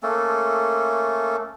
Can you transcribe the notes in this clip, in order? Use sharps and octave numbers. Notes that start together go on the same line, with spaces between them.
A3 A#3 C#4 A4